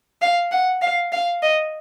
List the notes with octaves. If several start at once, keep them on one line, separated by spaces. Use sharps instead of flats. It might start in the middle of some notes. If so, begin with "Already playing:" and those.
F5
F#5
F5
F5
D#5